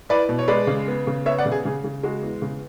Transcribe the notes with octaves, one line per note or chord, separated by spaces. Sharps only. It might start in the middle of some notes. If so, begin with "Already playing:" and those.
E4 B4 D5
B2
C#5
G#3 B4 D5
C#3
B3
C#3
B3 C#5 E5
D5 F#5
C#3
G#4
C#3 G#4
C#3
G#3 F#4
E2
C#3